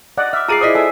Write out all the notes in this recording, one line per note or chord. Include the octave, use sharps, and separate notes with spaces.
D5 D#5 F#5
E5 D6 F6
F4 G#4 A#5 C7 D#7
E4 C5 D5 D#5 D#6 B6
A4 E5 G#5